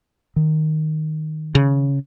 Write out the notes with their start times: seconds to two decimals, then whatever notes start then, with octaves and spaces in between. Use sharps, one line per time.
0.36 D#3
1.55 C#3